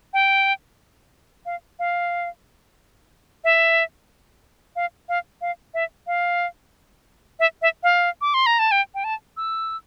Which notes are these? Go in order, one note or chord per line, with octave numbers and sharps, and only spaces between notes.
G5
F5
F5
E5
F5
F5
F5
E5
F5
E5
E5
F5
D6
C6
A#5
A5
G5
G5
A5
E6